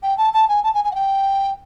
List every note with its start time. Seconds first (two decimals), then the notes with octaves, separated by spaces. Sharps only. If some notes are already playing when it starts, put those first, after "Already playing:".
0.03 G5
0.18 A5
0.33 A5
0.49 G#5
0.64 A5
0.74 G#5
0.85 G#5
0.91 F#5
0.95 G5